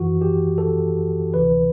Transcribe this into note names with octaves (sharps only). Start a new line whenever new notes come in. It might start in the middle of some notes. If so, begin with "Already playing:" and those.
Already playing: F#2 E3 F#4
G4
A4
D2 C3 E3 B4